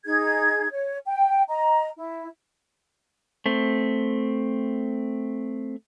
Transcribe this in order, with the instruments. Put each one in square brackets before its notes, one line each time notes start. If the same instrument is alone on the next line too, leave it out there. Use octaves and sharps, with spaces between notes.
[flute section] D#4 G#4 G#6
C#5
G5
D#5 A#5
E4
[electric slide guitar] A3 C4